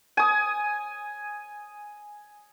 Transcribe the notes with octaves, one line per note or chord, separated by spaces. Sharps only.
G#5 D#6